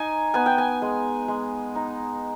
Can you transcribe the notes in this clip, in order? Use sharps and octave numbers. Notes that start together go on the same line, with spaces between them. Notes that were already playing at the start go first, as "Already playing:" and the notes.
Already playing: D#4 G#5
B3 G#5
G5
G#5
G#3
G#3
D#4